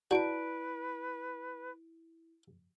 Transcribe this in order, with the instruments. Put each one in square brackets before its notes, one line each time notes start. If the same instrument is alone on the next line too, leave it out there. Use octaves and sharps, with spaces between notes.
[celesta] E4 D7 [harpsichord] F#4 [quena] B4 [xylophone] D5 A5